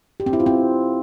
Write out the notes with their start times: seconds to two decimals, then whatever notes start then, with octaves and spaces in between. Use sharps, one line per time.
0.20 G4
0.26 C4
0.33 E4
0.40 F4
0.46 C4